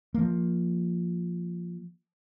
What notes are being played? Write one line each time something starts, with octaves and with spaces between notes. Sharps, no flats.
F3 A#3